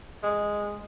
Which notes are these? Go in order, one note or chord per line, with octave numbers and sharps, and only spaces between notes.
G#3